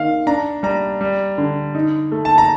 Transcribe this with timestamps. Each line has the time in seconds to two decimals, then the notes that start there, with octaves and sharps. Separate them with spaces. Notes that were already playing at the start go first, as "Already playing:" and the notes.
Already playing: D#3 F5
0.27 D4 A#5
0.63 G3 A#5
1.01 G3
1.38 D3
1.75 D#4
2.12 A3
2.25 A5
2.38 A#5